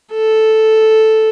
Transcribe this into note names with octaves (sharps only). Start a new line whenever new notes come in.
A4